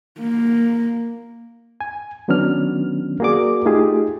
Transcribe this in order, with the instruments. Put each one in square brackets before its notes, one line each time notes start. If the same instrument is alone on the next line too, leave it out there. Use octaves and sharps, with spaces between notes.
[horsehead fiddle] A#3
[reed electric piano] G#5
D#3 F#3 B3 C#4 D4 F6
A#3 F#4 G#4 D5 D6
A3 D#4 F4 G4 G#4